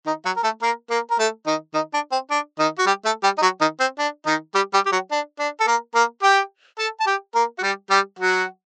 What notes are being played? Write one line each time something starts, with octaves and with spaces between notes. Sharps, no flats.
D#3 D#4
F#3 F#4
A#4
A3 A4
A#3 A#4
A#3 A#4
A#4
A3 A4
D#3 D#4
D#3 D#4
D4
C4
D4
D#3 D#4
F#4
G3 G4
A3 A4
G3 G4
D#4
F#3 F#4
D#3 D#4
C4
D4
D#3 D#4
G3 G4
G3 G4
G4
F#3 F#4
D4
D4
A4
A#3 A#4
A#3 A#4
G4 G5
A4 A5
A5
G4 G5
A#3 A#4
F#4
G3 G4
G3 G4
F#3 F#4